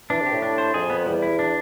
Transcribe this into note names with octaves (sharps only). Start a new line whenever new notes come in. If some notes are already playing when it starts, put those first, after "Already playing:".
E3 D4
C3
G4
A2
D4
C5
F2 G#4
B3
E2 G3
E4
D4